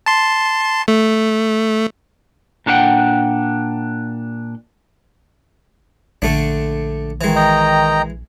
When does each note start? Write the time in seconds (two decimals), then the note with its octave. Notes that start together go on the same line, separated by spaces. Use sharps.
0.06 A5 C6
0.88 A3
2.66 A#2 D4 A4 C#5 F#5 G5
6.22 A#1 D3 A3 D4
7.21 D#3 E3 G#3
7.36 D#5 G5 A#5